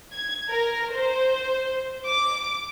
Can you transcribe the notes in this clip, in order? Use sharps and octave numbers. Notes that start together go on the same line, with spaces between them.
G#6
A#4
C5
D6